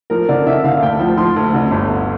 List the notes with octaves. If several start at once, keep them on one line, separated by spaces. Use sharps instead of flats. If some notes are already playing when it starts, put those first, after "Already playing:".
F3 A#4
D3 D5
D3 E5
D3 F5
D2 G5
F3
F3 C6
D2
D3
G1
G1